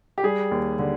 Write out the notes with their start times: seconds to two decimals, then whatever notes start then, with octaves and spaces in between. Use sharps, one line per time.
0.18 G4
0.23 G3 G#4
0.51 D#2
0.79 D3